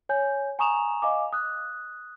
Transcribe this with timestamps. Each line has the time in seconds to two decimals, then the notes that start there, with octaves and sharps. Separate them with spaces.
0.09 C#5 G#5 G6
0.59 G#5 A#5 C#6 D#6 E7 F7
1.02 D#5 F5 G#5 D6
1.33 D#6 F#6